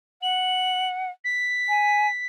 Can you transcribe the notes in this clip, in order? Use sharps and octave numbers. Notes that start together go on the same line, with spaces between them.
F#5 F#7
B6
G#5